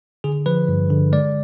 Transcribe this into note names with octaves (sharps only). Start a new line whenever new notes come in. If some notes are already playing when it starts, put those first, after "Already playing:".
D3 G#4
F3 B4
G2
D3
G#3 D5